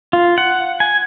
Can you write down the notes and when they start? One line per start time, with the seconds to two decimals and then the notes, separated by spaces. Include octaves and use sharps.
0.13 F4
0.38 F#5
0.80 G#5